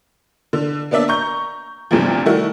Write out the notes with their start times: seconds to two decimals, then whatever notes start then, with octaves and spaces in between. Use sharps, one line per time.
0.53 D3
0.91 A#3 B3 D4 D5 E5
1.08 A#5 C#6 G6
1.91 G1 D2 G2 C3 E3 F3
2.26 D#3 G3 A3 E4 F#4